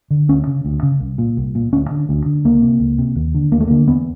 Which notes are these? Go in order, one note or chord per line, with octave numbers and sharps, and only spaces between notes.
D3
D2 C#4
C#3
D2
C#3
C2
A#2
C2
A#2
D2 C#4
D3
D2
D3
C#2 A#3
C3
C#2
C3
D#2
D3
D#2 A#3
A3
D3 A#3
E2 B3